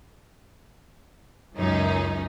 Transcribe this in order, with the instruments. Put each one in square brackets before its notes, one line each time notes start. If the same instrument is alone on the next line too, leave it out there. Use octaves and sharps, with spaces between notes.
[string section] C#2 F#2 C#4 D#4